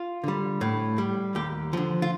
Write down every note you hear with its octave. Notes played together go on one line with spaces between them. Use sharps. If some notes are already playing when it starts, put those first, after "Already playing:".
Already playing: F4
D3 G3
A2
G3
D#2 G4
D3 F3
F4